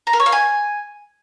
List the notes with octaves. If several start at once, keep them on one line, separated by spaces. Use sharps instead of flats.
A#5
A#4
C#5
F5
G#5